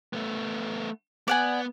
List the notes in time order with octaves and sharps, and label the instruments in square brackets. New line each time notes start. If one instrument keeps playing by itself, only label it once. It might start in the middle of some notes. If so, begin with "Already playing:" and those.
[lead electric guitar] A3 B3
[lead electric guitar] B3 [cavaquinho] D5 F#5 G#5